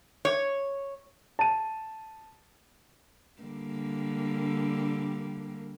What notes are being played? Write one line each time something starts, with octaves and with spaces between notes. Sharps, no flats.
C#5
A5 D#7
D3 G3 A#3